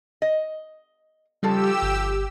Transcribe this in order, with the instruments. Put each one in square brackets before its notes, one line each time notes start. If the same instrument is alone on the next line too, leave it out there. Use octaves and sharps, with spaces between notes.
[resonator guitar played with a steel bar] D#5
[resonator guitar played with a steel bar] C#3 F3 A4 [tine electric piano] G3 [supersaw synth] G4 E6
[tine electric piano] G1